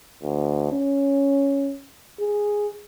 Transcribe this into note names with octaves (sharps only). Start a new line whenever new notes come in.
D2
C#4
G#4